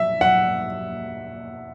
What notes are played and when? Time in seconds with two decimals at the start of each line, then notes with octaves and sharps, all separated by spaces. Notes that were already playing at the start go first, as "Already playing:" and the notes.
Already playing: E5
0.21 F#5